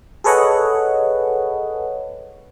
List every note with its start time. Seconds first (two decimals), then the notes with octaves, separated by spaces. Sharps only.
0.24 G#4 A4 B4 C#5 D#5 F#5